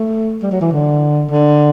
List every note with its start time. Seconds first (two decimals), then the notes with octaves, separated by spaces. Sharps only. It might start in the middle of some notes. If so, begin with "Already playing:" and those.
Already playing: A3
0.43 G3
0.51 F#3
0.61 E3
0.72 D3
1.30 D3